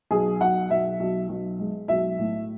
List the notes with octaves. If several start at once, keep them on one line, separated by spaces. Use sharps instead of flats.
B1 G#4
B1 F#5
B1 E5
B1
B1
G#3
B1 E5
A2